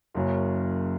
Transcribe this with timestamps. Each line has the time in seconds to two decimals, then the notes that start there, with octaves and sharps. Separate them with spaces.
0.14 F#1 F#2 C#3 F#3